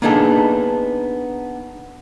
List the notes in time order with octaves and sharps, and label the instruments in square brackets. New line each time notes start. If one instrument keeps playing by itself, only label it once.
[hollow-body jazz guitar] A#3 B3 D4 D#4 G#4 A4